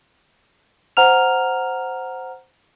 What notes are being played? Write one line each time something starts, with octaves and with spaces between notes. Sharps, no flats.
C5 F#5 A#5 F6 F7